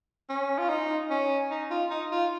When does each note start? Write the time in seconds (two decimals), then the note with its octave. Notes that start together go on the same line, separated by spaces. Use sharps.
0.29 C#4
0.58 F4
0.69 D#4
1.10 C#4
1.50 D#4
1.71 F4
1.91 D#4
2.11 F4